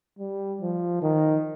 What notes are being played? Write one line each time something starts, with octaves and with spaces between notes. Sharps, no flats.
G3
F3
D#3